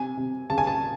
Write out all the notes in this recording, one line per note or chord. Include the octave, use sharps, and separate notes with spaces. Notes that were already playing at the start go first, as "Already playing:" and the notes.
Already playing: C3 G#5
C3
C#3 A5
G#5
A5